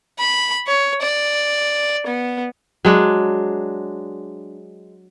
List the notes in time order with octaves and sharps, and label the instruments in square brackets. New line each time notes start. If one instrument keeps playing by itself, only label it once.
[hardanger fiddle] B5
C#5
D5
B3
[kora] F#3 G#3 D4